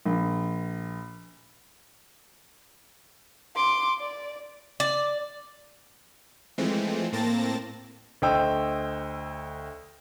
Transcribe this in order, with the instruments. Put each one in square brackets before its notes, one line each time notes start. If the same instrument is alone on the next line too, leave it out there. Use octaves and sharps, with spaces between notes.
[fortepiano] A#1
[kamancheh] C6 D6
D5
[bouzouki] D5
[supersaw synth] E3 F3 G#3 A3 C4
A2 A#3 C4 A5 A6 A#6
[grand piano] D2 C5 D#5 G5 E6